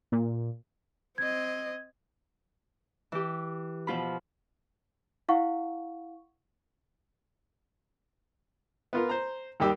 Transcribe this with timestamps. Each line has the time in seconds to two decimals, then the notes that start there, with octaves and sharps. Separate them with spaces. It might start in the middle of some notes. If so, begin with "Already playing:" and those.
0.12 A#2
1.18 C4 D#5 G#6
3.12 E3 G4
3.87 B2 F3 F4 B5
5.29 E4 F5 F#5 C#6
8.93 B3 F4 A#4
9.09 C5 A#5
9.60 D#2 D#3 G3 G4 E6